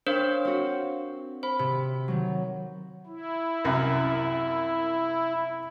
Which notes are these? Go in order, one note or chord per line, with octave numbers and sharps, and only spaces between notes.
D4 A#4 C5 C#5 F5 C6
C4 F#4
C5 B5
C3
D#3 F#3
E4
C2 F#2